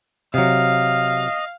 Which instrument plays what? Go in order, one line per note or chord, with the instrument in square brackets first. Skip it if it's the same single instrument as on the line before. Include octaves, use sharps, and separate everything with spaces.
[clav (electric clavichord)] C3 F#3 [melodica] D#5 [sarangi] F5